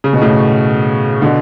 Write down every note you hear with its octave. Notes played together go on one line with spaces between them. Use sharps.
C#3
B2
A2 C#3
B2 D3